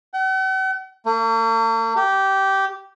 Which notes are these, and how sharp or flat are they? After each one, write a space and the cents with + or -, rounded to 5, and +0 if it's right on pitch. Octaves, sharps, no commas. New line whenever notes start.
F#5 +45
A#3 -45
G4 -15